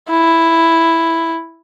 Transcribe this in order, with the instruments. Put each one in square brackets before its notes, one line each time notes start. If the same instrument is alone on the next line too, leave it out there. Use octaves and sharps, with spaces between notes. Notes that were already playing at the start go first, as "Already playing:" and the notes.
[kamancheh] E4